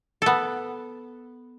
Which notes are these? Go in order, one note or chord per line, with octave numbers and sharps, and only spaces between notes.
B3 A4